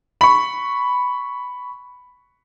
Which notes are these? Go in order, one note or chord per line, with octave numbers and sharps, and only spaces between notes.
B5 C#6